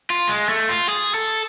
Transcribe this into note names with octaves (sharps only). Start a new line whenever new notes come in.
F4
G#3
A3
F4
G#4
A4